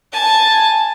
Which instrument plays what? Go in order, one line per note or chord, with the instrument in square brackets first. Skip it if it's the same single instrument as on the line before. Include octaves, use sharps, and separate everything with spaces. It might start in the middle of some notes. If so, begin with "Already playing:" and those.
[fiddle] G#5 A5